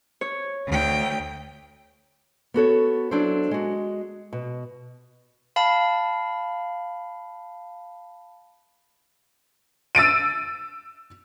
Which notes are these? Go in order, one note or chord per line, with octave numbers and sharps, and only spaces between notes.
C#5
D2 G5
B3 F#4 A4 C#5
F#3 D4 E4 A4 C5
G#3 F#4
B2
F5 A5 B5
E6 A6 D7 D#7